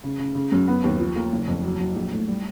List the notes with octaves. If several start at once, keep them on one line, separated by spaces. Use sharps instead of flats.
C#3
C#3
C#3
F#2
B3
D#2
F3
A#3
F#1
F2
F#3
F#3
A#1
A2
G3